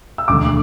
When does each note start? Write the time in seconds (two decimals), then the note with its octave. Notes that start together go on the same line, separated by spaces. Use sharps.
0.18 E6
0.28 E1 D2 D3 A3 D4 D6